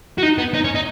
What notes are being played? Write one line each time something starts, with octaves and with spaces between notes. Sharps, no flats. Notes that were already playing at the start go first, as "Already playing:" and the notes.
F#4
D#4
B3
D#4
C#4
D#4